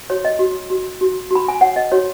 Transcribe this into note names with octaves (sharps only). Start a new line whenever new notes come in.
F#4 C#5
D#5
F#4
F#4
F#4
F#4 B5
G#5
C#5 F#5
D#5
F#4 C#5